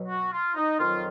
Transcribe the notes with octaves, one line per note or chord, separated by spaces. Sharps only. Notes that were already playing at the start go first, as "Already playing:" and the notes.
Already playing: B2 F#3
F#4
F4
D#4
F2 D#3 F#3 F4